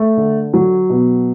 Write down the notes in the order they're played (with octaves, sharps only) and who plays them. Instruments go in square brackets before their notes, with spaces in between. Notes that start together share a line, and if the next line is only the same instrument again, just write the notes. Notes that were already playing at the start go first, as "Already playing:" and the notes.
Already playing: [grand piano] A3
D3
F#3
B2